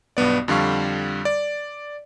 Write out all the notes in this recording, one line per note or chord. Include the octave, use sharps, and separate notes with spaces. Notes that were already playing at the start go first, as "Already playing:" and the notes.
B1 G2 B3 D5
F2 D3 G3 F5 C#6
D5